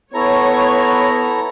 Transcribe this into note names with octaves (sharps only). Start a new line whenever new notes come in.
B3 E4 A4 C#5 A#5